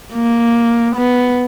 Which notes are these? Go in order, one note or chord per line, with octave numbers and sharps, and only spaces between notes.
A#3
B3